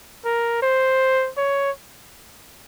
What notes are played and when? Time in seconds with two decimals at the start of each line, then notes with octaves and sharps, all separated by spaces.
0.25 A#4
0.62 C5
1.37 C#5